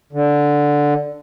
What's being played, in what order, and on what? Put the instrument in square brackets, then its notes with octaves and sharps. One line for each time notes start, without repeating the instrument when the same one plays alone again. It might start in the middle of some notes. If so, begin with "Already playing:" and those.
[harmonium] D3